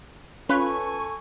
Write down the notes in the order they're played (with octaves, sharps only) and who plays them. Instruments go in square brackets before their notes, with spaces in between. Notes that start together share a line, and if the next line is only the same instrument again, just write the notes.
[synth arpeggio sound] C#4 F4 [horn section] A4 G#5 [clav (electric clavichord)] B4 [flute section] C#6